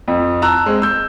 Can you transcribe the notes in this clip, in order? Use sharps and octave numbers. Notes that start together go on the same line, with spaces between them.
F2
A5 A#5 E6 F#6
G#3 C4
E6 G6